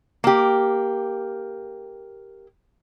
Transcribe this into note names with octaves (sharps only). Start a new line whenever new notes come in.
A#3 G4